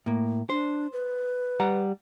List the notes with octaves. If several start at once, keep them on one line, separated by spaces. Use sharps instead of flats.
A2 A#3
D4 C5
B4
G3 F#5 A#5